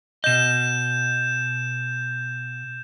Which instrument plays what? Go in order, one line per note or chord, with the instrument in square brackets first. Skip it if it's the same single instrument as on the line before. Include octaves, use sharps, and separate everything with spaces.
[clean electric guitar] B2 D#5 [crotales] G6 E7